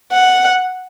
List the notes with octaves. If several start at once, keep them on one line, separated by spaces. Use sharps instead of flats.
F#5